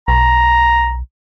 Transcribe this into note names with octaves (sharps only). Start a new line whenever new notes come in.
B1 A#5